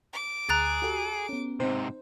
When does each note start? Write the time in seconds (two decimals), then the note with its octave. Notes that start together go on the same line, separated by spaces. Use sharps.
0.13 D6
0.49 D2 G#4 A#5 F#6 A6
0.82 F#4 G4 A4
1.29 B3 C#4
1.60 G#2 C3 C4 D#4 C5